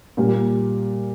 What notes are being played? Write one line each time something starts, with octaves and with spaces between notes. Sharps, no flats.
A#2 G3 A#3